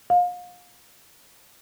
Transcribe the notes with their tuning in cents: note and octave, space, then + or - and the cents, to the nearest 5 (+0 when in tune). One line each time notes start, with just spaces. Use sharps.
F5 +35